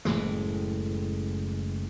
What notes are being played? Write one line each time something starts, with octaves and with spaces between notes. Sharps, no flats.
F#1 A2 E3 G#3